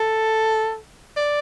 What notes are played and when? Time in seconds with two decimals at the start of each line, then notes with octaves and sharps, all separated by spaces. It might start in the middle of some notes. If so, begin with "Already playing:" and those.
Already playing: A4
1.17 D5